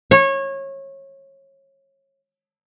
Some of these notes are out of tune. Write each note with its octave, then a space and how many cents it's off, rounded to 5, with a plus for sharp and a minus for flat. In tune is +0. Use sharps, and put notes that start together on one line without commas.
C#5 -25